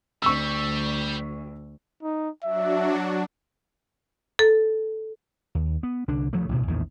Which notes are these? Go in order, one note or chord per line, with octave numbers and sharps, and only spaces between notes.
D2 G3 C#6 E6
D#4
F#3 D4 F#4 E5
A4
D#2
B3
C2 D3 D4
D2 F3 F#3 A3
A1 D2 G2 B2
A#1 E2 A2 D#3